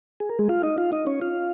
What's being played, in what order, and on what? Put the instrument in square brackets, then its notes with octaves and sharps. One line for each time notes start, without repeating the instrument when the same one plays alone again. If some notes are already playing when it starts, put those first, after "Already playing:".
[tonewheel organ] G#4
A#4
G#3 G#4
F4 F5
D#4 D#5
F4 F5
D#4 D#5
C#4 C#5
F4 F5